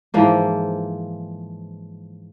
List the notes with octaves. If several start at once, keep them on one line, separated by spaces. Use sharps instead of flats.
G#2 E3 F3 A#3